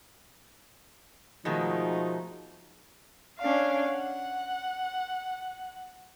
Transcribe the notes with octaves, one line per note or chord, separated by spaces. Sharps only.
B2 D#3 F3 G#3 A3 D#4
C#4 D4 F5
F#5